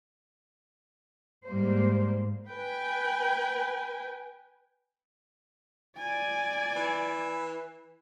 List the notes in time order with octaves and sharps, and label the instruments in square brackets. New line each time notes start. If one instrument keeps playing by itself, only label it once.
[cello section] G#2 G3 A#3 C5
[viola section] B4 G5 G#5
[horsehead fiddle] D5 G#5
[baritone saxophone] E3